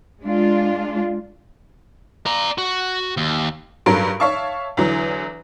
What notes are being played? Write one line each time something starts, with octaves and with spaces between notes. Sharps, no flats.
G#3 D4 F4
D5 A#5
F#4
D#2
G2 F#3 A4 A#4 D7
C#5 E5 F5 A5 C#6
E2 D3 E3 F#3